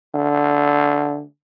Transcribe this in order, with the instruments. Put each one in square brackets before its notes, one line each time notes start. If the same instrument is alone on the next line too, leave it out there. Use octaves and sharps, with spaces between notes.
[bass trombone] D3